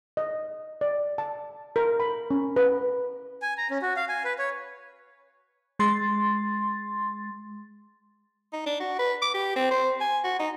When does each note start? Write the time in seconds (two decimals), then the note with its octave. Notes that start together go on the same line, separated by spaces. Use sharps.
0.17 D#5
0.81 D5
1.18 A5
1.76 A#4
2.00 B5
2.31 C#4
2.56 B4
3.42 G#5
3.58 A#5
3.71 C#4
3.82 F#4
3.97 F5
4.09 G#5
4.25 B4
4.39 C#5
5.79 G#3 C6 A6
8.53 D#4
8.66 D4
8.80 F#4
8.99 B4
9.22 D6
9.34 G4
9.56 C4
9.71 C5
10.01 G#5
10.24 F#4
10.40 D#4